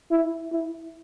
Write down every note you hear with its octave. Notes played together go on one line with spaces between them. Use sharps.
E4
E4